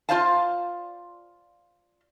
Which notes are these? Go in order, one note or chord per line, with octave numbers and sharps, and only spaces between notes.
F4 G4 C5 D5 F5 A5